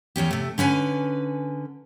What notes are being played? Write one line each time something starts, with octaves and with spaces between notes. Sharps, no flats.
E2 G2 C#4 G4
C3 A3
D3 C#4 B4 G#5